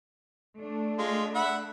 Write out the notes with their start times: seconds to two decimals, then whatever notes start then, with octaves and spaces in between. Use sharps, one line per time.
0.59 A3 D4
0.99 G#3 F4
1.35 E5 F#5 B5